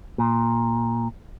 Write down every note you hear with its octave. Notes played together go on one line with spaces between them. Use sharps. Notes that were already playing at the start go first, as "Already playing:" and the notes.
A#2